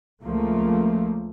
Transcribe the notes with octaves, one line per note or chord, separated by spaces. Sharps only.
C#2 F3 A3 A#3